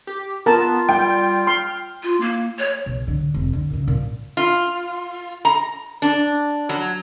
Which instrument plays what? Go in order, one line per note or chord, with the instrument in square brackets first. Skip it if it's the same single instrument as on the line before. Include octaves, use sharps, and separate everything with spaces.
[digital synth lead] G4
[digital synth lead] B3 [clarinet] F4 [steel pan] A#4 A5
[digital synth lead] G3 [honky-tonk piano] G5
[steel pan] C6 [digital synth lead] F6
[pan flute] F4
A#3
C#5
[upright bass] B1
D3
F1
D3
A#2 C#3
A#2
[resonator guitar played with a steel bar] F4
A#5
D4
F#3